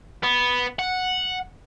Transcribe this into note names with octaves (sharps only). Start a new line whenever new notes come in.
B3
F#5